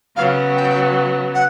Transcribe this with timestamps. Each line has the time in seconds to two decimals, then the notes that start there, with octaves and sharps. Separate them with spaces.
0.16 C#3 F#3 B3 F5
0.56 G5
1.34 F#5